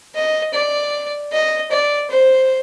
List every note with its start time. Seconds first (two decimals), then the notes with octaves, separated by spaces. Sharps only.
0.15 D#5
0.54 D5
1.32 D#5
1.71 D5
2.11 C5